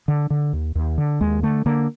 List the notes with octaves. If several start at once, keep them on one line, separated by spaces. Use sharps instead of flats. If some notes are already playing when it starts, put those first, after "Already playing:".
D3
D3
D#2
D#2
D3
D#2 G#3
D3 A3
D3 A#3